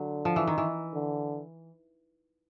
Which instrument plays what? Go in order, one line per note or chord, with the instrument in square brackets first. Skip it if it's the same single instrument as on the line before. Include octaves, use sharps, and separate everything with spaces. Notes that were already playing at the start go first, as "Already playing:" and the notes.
Already playing: [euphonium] D3 [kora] F#3
[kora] F3
E3
D#3
E3
[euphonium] D3